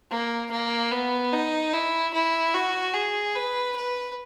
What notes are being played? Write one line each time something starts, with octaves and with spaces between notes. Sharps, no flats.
A#3
A#3
B3
D#4
E4
E4
F#4
G#4
B4
B4